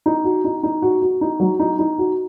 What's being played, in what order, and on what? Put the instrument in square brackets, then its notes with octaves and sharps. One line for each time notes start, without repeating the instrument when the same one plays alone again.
[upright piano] D#4
F#4
D#4
D#4
F#4
F#4
D#4
F#3
D#4
D#4
F#4